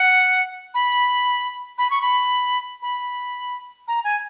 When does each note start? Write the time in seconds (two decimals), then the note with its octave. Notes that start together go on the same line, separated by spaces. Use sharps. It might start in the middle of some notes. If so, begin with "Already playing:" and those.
Already playing: F#5
0.74 B5
1.78 B5
1.91 C#6
2.02 B5
2.82 B5
3.88 A#5
4.04 G#5